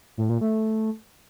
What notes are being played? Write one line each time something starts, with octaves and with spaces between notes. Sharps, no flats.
A2
A#2
A3